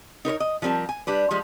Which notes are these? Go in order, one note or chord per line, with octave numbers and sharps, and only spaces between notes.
D#4 A#4 B4 C#5
D#5
F3 G3 C4 A#4 A5
G#5
G3 D4 B4
F3 G3 G#3